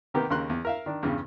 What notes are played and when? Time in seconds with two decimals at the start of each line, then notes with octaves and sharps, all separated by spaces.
0.14 C3 D#3 A#3 B3 G4 A#4
0.30 D#2 C#3 A#4 C6 F#6
0.50 E2
0.65 A#4 E5 F5
0.86 D#3 D4
1.03 E2 G2 C#3